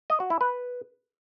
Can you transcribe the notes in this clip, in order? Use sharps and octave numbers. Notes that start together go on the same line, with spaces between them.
D#5
F#4
E4
B4